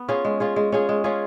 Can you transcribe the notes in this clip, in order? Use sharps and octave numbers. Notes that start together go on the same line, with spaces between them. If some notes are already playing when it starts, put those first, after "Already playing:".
Already playing: B3
C#4 F4 G#4
G#3
C#4 F4 G#4
G#3
C#4 F4 G#4
G#3
C#4 F4 G#4